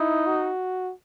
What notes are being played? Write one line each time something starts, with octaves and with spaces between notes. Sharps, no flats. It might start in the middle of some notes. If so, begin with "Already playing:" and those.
Already playing: D#4 E4
F#4